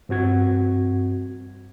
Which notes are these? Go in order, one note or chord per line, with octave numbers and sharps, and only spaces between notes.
G2 C4 F#4 G#6